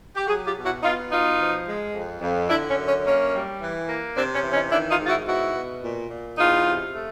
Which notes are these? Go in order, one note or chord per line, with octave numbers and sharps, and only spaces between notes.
G4
F#3 F#4 G#4
F4 G4
B2
E4 F#4
B3 D#4 F4
B2 D#4 F4
F3
G#3
F2
F2
D3 D4 E4
C#4
F#2
C#4
A#3 C#4
G3
E3
A#3
C3 C4 D4
C#4
E3
C#4 D#4
D#3 D4 E4
D#4 F4
G#2
F4
E4 F#4
B2 E4 F#4
B2
A#2
A#2
E2 D#4 F4
C3
A3